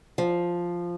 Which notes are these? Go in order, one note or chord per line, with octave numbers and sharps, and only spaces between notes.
F3